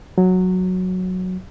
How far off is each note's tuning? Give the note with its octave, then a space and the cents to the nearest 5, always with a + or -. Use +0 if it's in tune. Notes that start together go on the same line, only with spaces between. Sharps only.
F#3 -10